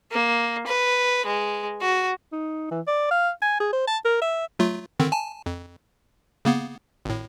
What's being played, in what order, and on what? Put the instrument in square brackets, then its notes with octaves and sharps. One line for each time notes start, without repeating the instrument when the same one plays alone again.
[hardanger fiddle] A#3
B4
G#3
F#4
[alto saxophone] D#4
E3
D5
F5
G#5
G#4
C5
A5
A#4
E5
[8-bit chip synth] F#3 A3 F4
D3 D#3 C4
G#5 A5
F2
C#3 A#3 B3
G#1 A2